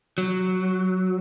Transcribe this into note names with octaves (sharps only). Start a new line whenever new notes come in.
F#3